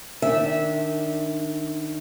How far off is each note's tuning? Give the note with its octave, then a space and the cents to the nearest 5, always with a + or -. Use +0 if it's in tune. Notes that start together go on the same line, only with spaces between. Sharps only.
D#3 -15 D4 +0 E5 -20